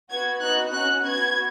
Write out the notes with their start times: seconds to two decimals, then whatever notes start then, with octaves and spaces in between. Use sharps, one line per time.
0.10 B3 F#4 G#6
0.41 B3 D#4 F#4 F#6
0.73 C#4 F#4 F#6
1.04 B3 F#4 G#6